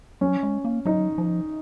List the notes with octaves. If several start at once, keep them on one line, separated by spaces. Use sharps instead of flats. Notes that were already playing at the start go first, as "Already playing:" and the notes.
F#3 C#4
G#3
A#3
F#3 D#4
F3